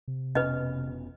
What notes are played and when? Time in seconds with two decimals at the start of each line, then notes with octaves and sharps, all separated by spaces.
0.08 C3
0.35 F1 B2 C#4 B4 D#5